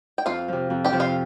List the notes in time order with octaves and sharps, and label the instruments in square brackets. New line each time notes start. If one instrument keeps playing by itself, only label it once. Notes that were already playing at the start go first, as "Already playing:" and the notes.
[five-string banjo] G5
[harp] F2 [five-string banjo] F4 F5
[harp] C3 F3
F2
[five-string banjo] G4 G5
[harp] C3 F3
[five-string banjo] F4 F5